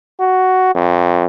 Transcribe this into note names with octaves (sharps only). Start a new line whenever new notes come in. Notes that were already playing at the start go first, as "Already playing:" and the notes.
F#4
F2